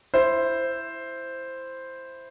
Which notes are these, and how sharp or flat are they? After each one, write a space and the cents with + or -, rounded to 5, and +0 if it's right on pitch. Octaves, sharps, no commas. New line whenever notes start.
E4 +10 C5 +0